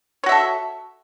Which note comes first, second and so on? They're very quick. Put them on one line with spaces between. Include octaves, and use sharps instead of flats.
C#5 F#4 E5 A4